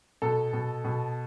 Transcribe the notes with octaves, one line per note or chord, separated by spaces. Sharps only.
B2 A4
B2
B2